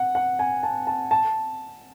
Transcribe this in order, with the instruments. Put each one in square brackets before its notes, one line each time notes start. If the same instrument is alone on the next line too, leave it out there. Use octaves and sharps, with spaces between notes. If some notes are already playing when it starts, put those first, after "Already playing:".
Already playing: [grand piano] F#5
F#5
G#5
A5
A5
A5